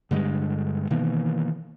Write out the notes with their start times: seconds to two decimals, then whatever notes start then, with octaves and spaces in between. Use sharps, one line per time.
0.11 G2 D3 G3 G#3
0.90 B2 D#3 E3 A#3